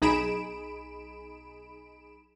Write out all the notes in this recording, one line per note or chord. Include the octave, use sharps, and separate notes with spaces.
B1 D#4 G#4 B5 D7 E7